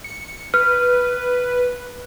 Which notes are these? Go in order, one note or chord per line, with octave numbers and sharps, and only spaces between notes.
C#7
B4 F6